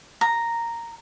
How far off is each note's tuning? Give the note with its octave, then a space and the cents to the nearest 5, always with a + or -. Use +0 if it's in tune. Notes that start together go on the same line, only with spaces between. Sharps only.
A#5 -5